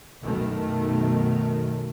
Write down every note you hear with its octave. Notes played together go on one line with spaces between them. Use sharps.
B1 F#2 B2 D#3 A3